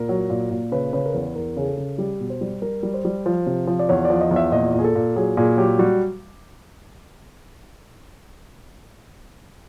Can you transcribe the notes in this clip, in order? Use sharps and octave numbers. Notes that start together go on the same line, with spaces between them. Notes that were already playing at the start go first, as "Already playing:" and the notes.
Already playing: A#2 A#4
F#3
A#2
A#2
C#3 B4
C#3 B4
A#4
E2 B4
E2 A#4
C#3 G#4
A4
C#3
G3 G4
B2
C5
G3
G3 A#4
G3
C5
G3
F3
C3
F3
D5
E2 C#5
D5
F3
D#5
E2
E5
A#2 D#5
A#2
G#4
A4
A#2
F#3 G#4
A#2 G#4
F#3 G4
G3 F#4